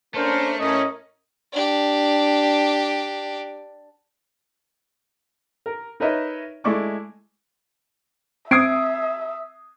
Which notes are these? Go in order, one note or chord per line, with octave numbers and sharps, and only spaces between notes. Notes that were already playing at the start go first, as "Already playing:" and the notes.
A3 A#3 C#4 D4 A#4 C5
A2 C#4 A#4 D#5
D4 G4
A#4
D#4 A#4 B4 C#5 D#5 E5
G#3 A3 E4 D5 C#6 D6
C4 E5 D#6 G#6 C7 D7